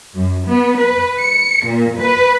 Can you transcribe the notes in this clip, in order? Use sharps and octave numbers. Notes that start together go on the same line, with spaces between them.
F#2
B3
B4
C#7
A#2
B4